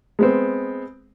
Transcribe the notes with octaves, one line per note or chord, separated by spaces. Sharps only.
G#3 B3 C4